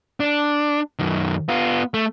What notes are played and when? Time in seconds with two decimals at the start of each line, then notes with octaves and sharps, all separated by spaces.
0.20 D4
0.99 F#2 D#3
1.49 B3 F4
1.94 A3